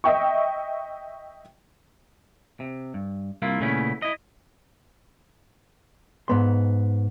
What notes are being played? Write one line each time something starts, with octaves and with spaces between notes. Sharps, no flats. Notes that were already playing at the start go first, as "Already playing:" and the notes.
D#5 E5 G5 C#6
C3
G2
C2 A#3 E4 F4
A#2 C#3 A3 B3 C#4 E4
E4 D#5
G#2 B3 C6